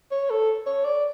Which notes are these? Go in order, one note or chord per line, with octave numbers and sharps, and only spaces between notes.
C#5
A4
C#5
D5